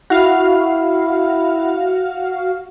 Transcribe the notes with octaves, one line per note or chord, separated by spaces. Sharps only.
E4 F#4 F5